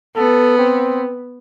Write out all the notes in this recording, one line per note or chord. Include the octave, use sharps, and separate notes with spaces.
B3 A4
C4